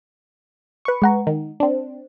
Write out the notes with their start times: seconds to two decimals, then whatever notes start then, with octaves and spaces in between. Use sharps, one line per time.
0.85 B4 C#6
1.02 G#3 F#5 A#5
1.27 D#3
1.60 C4 D4